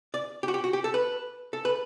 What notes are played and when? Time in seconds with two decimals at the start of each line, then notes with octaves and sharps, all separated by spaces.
0.14 D5
0.43 G4
0.48 F#4
0.54 G4
0.64 F#4
0.73 G4
0.84 A4
0.94 B4
1.53 A4
1.65 B4